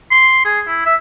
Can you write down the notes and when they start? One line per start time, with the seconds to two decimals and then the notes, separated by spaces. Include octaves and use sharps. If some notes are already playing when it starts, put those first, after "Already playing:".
0.11 C6
0.45 G#4
0.67 E4
0.86 E5